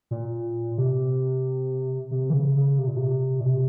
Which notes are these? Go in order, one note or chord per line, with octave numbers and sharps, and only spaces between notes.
A#2
C3
C3
E3
C#3
C#3
C3
A#2
C3
A#2
C3